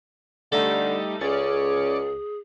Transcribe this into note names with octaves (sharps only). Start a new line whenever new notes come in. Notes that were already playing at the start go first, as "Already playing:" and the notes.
D3 G3 A3 D#4 A4
C#2 C#4 G#4 D5 C#7